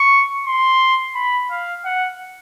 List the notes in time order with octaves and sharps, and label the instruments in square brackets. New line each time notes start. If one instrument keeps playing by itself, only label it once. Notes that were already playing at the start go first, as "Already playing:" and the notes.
Already playing: [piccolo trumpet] C#6
C6
B5
F5
F#5